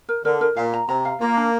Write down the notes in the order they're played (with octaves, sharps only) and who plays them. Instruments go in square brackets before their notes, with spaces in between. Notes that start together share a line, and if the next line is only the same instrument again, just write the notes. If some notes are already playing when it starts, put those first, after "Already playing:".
[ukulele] A#4
[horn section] D3 [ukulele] A#4
[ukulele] A#4
[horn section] A#2 [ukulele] F5
[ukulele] A#5
[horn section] C3 [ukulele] A#5
[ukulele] F5
[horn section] A#3 [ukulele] F4
[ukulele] D4